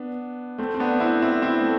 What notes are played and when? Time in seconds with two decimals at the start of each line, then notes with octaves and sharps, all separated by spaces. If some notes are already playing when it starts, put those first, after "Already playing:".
Already playing: B3 D4
0.58 A3 C4
0.74 C4
0.80 B3 D4
1.00 C4 E4
1.22 C4 E4
1.42 C4 E4
1.61 A3